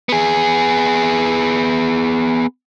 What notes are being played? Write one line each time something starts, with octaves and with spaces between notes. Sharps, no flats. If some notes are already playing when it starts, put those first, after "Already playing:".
B3 G#4